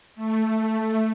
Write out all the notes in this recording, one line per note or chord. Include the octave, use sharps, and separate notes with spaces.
A3